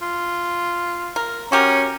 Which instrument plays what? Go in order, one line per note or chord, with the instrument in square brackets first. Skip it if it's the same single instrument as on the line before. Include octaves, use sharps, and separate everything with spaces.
[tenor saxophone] F4
[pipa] A#4
[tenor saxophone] C#4 [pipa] F#4 G4 A#4